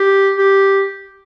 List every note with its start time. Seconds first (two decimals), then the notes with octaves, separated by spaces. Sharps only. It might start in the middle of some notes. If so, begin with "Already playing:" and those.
Already playing: G4
0.37 G4